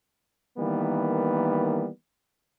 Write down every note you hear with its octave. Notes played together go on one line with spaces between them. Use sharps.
D#3 E3 G3 A#3 B3